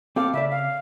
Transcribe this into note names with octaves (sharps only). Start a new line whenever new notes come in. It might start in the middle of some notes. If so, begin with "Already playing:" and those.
C4 A4 F5 D6
C#3 D5 E5
F5